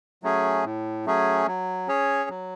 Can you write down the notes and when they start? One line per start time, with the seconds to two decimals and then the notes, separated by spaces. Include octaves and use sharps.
0.23 F#3 A3 C#4 G#4
0.64 A2
1.06 F#3 A3 C#4 G#4
1.47 F#3
1.88 C#4 G#4 C#5
2.30 F#3